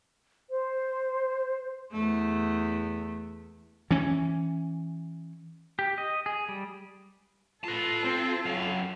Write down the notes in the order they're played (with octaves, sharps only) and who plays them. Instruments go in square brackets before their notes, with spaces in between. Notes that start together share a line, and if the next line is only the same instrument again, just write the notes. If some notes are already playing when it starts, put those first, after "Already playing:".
[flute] C5
[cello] E2 A3
[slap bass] E3 C#4
[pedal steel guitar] G4
D#5
G#4
G3
[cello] F4 A4 [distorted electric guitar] B4 A5
[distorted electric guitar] C4
F#2 F5